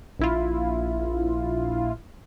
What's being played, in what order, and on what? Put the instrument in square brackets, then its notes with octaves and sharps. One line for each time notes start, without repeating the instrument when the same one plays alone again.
[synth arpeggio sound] A#1 E4 F4